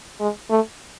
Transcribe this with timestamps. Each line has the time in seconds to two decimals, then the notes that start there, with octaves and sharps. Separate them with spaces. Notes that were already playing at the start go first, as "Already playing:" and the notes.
0.20 G#3
0.50 A3